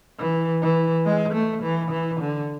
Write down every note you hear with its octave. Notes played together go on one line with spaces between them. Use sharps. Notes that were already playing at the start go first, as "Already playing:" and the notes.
E3
E3
G#3
A3
E3
E3
D3